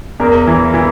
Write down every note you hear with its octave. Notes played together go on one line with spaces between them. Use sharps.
E2 A#4
E3
E3